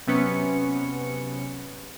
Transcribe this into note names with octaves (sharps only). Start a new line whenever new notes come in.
C3 F#3 B3 C#4 B4 C#7